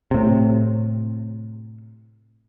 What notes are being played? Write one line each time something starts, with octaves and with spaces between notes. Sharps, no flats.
A2 C3